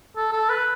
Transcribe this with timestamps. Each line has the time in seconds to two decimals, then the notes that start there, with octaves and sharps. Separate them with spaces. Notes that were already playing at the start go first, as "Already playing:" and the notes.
0.17 A4
0.33 A4
0.49 B4